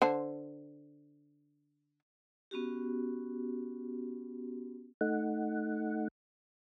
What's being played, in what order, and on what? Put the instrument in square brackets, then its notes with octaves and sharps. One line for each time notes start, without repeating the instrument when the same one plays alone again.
[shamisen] D3 C5 A5
[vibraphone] B3 C#4 F#4 G4
[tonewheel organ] A3 D#4 F#5